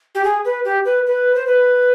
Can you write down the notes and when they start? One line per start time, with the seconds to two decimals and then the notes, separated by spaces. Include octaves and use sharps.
0.15 G4
0.24 G#4
0.45 B4
0.65 G4
0.85 B4
1.06 B4
1.35 C5
1.46 B4